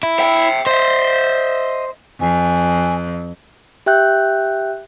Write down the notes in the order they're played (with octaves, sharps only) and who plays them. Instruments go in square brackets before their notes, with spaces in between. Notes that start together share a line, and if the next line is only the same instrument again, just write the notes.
[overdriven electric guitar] E4
[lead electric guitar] E5 G5
[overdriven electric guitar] C5 [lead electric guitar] D#5 E5
[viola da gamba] F2 [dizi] G#5
[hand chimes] G4 E5 G5 F#6 G6